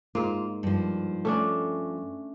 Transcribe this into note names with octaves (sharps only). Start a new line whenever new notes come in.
G#2 A#3 F4
G2 F3
A3 C#4 D4